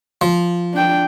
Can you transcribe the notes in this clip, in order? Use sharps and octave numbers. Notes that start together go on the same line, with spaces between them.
F3
D4 G5